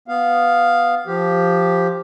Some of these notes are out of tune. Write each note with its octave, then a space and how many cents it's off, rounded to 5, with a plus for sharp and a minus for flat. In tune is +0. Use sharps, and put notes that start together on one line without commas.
B3 +0 F5 +0
F3 +0 G4 +0